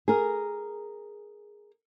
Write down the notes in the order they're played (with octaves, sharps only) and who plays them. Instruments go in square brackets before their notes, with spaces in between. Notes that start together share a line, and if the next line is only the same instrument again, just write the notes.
[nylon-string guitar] G#4 A#4